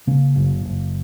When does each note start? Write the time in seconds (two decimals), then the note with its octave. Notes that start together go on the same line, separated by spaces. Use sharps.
0.07 C#3 A#3 C#4
0.36 F#1
0.65 F#1